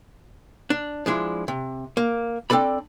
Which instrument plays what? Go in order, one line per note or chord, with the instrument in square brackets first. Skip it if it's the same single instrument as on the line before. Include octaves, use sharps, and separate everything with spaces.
[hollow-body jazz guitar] D4
F3 G#3 D4 E4
C3
A#3
C4 D4 A4 D5 B5